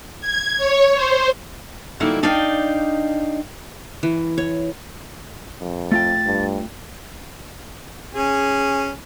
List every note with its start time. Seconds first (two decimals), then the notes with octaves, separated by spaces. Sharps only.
0.20 G#6
0.57 C#5
0.95 C5
2.00 D3 F#3 G3 A#3 D#4 E4
2.23 D4 D#4 D5 D#5 F5 G5
4.03 E3
4.38 C#5
5.60 F2
5.92 A3 F4 G5 A6
6.26 G2
8.15 C#4 G#4